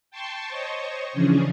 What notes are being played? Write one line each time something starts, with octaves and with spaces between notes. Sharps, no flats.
G5 A5 C6 C#6
C5 C#5 D#5 C#6
C#3 E3 F3 C#4 D4 G#4